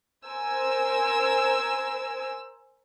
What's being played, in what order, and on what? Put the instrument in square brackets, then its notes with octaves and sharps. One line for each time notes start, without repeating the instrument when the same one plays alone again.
[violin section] A#4 C5 G#5 E6